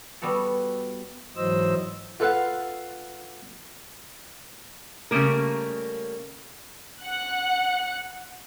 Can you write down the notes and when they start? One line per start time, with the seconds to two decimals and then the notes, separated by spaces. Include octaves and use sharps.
0.22 G3 B3 F#4 A4
1.36 G#2 E3 F#3 C5 D#5 E6
2.20 F4 A4 B4 F5 F#5
5.11 C#3 G3 A3 A#3 A#4
7.03 F#5 F#6